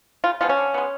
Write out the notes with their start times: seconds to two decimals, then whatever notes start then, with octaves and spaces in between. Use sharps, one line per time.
0.24 C#3 F4
0.41 F3 G#3 B3 F4
0.49 C#4
0.57 D3
0.74 G#3 B3